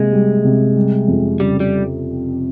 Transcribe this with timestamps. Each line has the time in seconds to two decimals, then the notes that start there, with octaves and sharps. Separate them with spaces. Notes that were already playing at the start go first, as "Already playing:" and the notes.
Already playing: C3 G#3 A#3
0.13 G3
0.44 C3
0.76 G3
1.08 F2
1.40 C#3 G3
1.60 G3